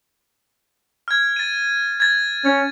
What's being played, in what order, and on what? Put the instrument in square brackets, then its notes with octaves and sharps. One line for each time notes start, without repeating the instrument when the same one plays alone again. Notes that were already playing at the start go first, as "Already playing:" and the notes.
[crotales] F6 G#6
A6 D#7
G#6 A6
[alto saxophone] C#4 [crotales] G#6